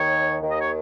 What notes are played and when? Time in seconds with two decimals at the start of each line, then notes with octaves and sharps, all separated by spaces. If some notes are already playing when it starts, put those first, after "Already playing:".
Already playing: D#2 D#3 C#5
0.41 D#2 D#3
0.51 D#5
0.61 C#5